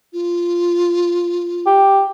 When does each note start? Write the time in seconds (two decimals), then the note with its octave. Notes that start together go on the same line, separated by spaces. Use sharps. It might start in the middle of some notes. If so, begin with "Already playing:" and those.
0.13 F4
1.67 G4